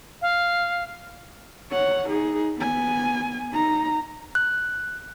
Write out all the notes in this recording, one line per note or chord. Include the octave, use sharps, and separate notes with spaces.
F5
C#5 F#5
D#4 G#4
B3 G#5
D#4 A#5
F#6